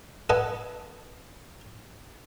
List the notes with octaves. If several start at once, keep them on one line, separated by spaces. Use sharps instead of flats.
A4 B4 D#5 F#5 G#5